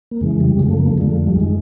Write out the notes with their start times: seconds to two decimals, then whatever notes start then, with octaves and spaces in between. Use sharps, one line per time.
0.11 A#3
0.21 F2 C#3 E3 G#3
0.40 G3
0.59 F#2 C#3 F3 G#3
0.69 A3
0.79 A#3
0.88 A3
0.98 F2 D3 F3 G#3
1.07 A3
1.27 G3
1.36 F#2 D#3 G#3